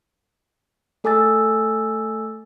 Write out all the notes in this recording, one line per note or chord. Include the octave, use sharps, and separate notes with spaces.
A3 A4 G#5 D6 E6 A6